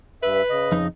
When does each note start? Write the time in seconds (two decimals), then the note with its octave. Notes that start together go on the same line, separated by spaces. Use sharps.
0.23 G2 B4 E5
0.50 C#3 D#5
0.72 F2 D#4